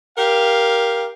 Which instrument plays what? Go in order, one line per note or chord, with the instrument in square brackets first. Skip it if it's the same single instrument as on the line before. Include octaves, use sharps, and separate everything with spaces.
[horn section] G4 A#4 F5